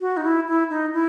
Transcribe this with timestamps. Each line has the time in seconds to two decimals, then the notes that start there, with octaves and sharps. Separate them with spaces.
0.01 F#4
0.17 D#4
0.24 E4
0.47 E4
0.70 D#4
0.93 E4